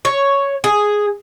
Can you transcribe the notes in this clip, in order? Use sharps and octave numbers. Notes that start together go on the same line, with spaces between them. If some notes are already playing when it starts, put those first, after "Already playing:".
C#5
G#4